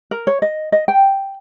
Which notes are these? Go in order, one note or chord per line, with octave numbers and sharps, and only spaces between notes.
A#4
C#5
D#5
D#5
G5